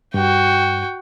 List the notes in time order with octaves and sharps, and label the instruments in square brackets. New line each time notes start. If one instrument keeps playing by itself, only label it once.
[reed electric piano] G2 [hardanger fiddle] F#4 G5